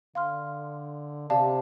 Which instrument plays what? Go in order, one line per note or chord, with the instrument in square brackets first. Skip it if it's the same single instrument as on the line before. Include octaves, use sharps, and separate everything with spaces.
[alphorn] D3 [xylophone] F5 C6 F6
[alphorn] C3 [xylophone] G4 D5 F5 A5